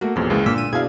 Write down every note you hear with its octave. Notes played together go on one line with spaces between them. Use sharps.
A3 A#3 F#4
A1 F2 B2 A#3 G#4
C#2 E3 G#3
A#2 D3 A#3 E6 B6
D#7
B2 D4 E4 G#4 F5 G#6